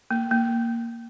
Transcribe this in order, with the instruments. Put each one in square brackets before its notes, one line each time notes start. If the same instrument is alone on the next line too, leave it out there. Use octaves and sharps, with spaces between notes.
[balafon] A#3
A#3